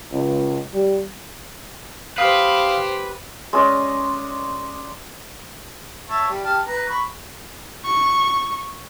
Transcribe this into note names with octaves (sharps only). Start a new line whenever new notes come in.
C#2
G3
G4 B4 C5 F5 D#6 F6
G#3 C#4 D5 D#5
C#5 E5 A5
G3
G4 A5 F6
B4 A#5
B5 C#6
C#6